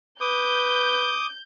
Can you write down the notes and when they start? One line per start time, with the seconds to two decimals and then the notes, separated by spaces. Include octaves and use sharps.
0.21 B4 D6 D#6 G6